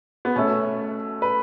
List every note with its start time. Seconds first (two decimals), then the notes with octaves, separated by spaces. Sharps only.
0.25 B3
0.36 B2 A3 C#4
1.22 B4